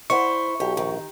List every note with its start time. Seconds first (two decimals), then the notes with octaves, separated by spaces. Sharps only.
0.10 E4 C5 D5 F#5 C#6
0.60 B1 G4
0.77 A#1 D#3